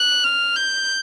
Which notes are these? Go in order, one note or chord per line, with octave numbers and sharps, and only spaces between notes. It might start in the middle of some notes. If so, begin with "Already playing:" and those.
Already playing: F#6
F6
G6